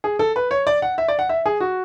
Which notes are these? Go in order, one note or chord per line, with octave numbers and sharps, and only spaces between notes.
G#4
A4
B4
C#5
D5
F#5
E5
D5
F#5
E5
G#4
F#4